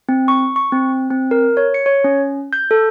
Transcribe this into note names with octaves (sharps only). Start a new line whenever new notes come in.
C4
C#6
C#6
C4
C4
A#4
C#5
C#7
C#5
C#4
G6
A4